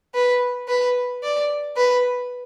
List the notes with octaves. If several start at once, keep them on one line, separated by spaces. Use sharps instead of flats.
B4
B4
D5
B4